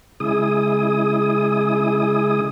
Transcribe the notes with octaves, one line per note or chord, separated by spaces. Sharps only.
C#3 G#3 E4 G#4 D#6